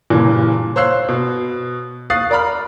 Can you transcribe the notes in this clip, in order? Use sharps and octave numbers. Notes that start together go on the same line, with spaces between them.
F#1 G2 A#2 E3
C5 C#5 F5 E6 F#6 C7
B2
F5 C#6 D#6 F#6 A6 C7
A#4 D5 A#5 B5 F6